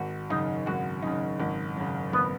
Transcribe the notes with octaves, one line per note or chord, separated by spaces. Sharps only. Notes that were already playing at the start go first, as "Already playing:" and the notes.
Already playing: G#1 F#4
F#2 C#3 D#4
G#1 F#4
F#2 C#3 D#4
G#1
F#2 C#3
G#1 B3